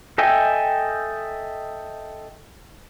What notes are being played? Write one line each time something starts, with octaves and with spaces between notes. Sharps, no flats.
A4 D#5 E5 G5 G#5